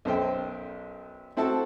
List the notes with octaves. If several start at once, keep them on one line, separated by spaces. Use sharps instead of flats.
B1 F#2 C5 G5
C4 E4 F#4 A4 A5